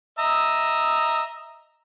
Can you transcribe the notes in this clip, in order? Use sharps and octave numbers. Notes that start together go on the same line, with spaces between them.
D#5 E5 A#5